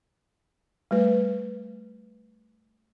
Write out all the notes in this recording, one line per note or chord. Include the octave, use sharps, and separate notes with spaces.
G3 A3 B4